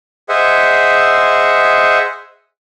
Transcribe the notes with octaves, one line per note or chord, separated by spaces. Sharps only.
G#4 C5 D#5 E5 F#5